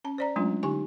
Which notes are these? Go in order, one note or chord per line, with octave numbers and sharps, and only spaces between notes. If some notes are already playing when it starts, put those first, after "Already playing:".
C#4 A5
C5 D5 A#5
F#3 G#3 A3 C#4 D4 F4
D3 D#4 G4 G#5 C#6